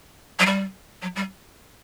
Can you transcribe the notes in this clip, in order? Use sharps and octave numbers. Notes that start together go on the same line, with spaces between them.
F#3
G3
F#3
G3